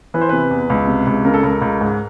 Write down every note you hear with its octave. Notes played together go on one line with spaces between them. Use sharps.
E3 B4
C5
C3 B4
E2
C#2
C3
C#2
C#3 A#4
A4
C#2 A#4
C#2
G#2